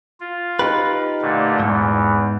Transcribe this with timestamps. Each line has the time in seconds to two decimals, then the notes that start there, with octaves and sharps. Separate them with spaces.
0.20 F4
0.59 D#4 G4 B4
1.22 A#2 D3 A3
1.60 E2 G#2